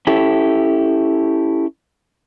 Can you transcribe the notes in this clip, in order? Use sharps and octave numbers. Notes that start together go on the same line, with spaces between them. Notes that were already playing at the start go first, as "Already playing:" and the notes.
C#4 E4 G4 A4